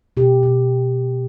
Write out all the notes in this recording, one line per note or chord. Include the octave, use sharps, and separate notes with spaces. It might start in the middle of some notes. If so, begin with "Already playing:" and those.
B2 G4
B2